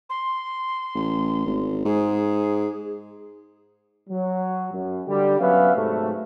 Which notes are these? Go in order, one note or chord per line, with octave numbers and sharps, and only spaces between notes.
C6
A1
G#1
G#2 G#4
F#3
F#2
D3 G3 G4
F#3 B3 C#4 B4 E5 F5
G#2 C3 F#3 A3